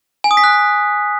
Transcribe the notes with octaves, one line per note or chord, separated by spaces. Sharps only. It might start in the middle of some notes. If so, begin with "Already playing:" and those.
G#5
D#6
B6
F#6